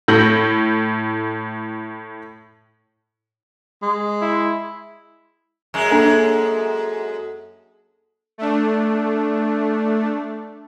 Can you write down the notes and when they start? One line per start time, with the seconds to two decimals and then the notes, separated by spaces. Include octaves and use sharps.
0.08 A2 A4 G6 A#6 F#7
3.82 G#3
4.22 E4
5.74 F#2 G#3
5.91 A#3 D4 A4
8.38 A3 D4